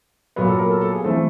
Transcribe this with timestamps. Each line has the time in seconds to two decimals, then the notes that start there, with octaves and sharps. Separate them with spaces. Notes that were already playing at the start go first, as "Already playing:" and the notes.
0.36 A#2 F#3 B3 B4
0.47 A4
0.58 A#4
0.70 A4
0.81 A4
0.92 G#4
1.04 E3 A3 C4 A4